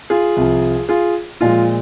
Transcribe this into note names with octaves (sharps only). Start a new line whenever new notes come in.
F4 G#4
C2 C3 F3
F4 G#4
A#2 F3 G#3 F4